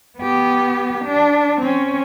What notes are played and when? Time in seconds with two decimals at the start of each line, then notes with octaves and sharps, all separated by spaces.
0.19 B3 G4
1.05 D4
1.61 C4 C#4